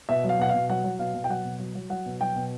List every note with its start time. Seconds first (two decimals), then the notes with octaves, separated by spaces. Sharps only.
0.09 B2 E5
0.24 F#3
0.29 F5
0.39 B2 F#5
0.49 B2 F5
0.69 F#3 F#5
0.84 F#3
0.99 B2 F5
1.14 B2
1.24 G5
1.29 F#3 F#5
1.45 B2
1.60 F#3
1.75 F#3
1.90 F#3 F#5
2.06 B2
2.20 F#3 G5
2.36 B2